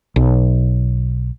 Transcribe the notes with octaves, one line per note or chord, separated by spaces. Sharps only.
B1